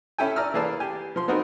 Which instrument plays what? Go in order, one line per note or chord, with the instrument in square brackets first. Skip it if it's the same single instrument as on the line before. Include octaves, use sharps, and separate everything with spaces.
[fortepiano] C#4 E4 A4 G5 G#5
D5 A#5 E6 F6
E3 A#3 G#4 D5 F5 A5
G4 G#5
F3 C6
B3 C4 D#4 F#4 A#4